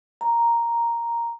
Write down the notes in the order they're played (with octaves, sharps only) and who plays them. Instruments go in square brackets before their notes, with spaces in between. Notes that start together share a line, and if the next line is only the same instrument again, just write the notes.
[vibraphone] A#5